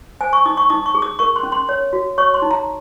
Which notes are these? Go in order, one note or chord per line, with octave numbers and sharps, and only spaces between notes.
C5 G#5
C#6
D#4 D#6
C#6
D#4 D#6
C#6
G#4
D#6
A#4 C#6
C6
C#4
C6
C#5
F#4
C#5 C#6
C6
D#4
A#5